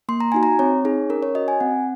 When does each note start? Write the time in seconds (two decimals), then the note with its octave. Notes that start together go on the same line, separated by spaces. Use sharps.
0.09 A#3 C6
0.20 A#5
0.32 D#4 F#4 G#5
0.43 A#5
0.59 C4 C#5
0.85 D#4 G#4
1.10 C#4 A#4
1.23 C#5
1.35 F#4 D#5
1.48 G#5
1.60 C4 F#5